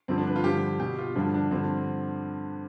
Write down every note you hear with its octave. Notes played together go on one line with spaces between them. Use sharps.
G2 D3 F3 C4
D4
B4
F4
G2 D3 F3 G4
B2 G4
F4
G2 D3 F3 D4
D4
G2 D3 F3 C4